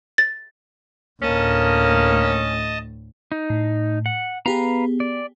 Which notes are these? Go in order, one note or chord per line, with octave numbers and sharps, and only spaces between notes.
A6
D2 A2 A#3 C#4 D#5 A5
D#4
A2
F#5
B3 G4 G#4 B4 F5 A#5
D5